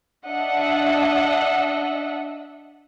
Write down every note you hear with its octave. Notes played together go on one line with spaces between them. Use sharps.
D4 D#5 E5 F#5